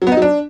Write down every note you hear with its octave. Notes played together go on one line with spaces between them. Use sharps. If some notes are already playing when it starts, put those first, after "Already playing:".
F#3
B3
D#4
F#3
D4